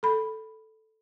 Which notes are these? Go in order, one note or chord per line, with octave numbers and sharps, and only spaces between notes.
A4 B5